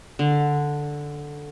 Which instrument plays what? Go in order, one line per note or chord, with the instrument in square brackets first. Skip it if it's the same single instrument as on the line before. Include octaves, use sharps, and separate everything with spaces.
[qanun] D3